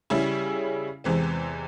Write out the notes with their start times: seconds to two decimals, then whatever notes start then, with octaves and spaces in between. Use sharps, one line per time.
0.10 C#3 G3 C#4 E4 G#4
1.04 E2 C3 E3 G#3 C4